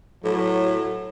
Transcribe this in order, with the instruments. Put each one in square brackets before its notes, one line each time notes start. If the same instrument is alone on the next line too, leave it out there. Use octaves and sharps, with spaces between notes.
[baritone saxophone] A2 [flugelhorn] F#3